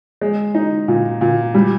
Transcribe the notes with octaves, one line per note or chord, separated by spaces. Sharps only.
G#3
D#4
A#2
A#2
G3